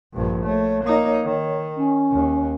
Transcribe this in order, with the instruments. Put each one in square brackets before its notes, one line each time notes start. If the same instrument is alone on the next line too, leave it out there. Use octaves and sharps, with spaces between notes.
[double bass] A#1 G2
[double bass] A3 [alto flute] C#5
[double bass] A#3 D#4
D#3
[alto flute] C#4
[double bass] D#2